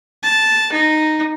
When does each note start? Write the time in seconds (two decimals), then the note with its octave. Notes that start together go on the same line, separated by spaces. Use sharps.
0.23 A5
0.72 D#4